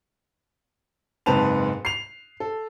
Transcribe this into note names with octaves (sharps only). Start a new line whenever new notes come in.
F#1 G#2 C4 B4 A5 F7
C7 F7
A4